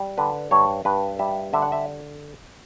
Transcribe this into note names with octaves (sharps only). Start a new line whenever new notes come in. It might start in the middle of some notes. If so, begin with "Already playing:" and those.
Already playing: G3
D3 B4
G2 C#5
G2 B4
G3 E5
D3 E5
F#5
E5